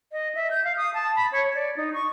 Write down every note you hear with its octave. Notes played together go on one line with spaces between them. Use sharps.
D#5
E5
G6
F5
D#6
A5
B5
C#5
D5
D#4
C#6